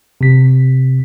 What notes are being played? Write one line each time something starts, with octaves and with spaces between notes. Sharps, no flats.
C3 B6